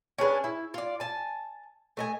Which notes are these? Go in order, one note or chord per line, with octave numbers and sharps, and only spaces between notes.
C#4 D4 G#4 B4
E4
F4 D5
G#5 A5
A3 D#5 G#5